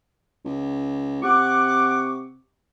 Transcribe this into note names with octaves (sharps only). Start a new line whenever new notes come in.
C#2
C3 F#5 C#6 D6